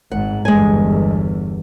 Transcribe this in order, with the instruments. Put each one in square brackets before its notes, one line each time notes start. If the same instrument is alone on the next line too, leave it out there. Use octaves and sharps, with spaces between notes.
[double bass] G#1 G#2 [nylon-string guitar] F#5
[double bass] G1 E2 [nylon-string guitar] G#3 G#5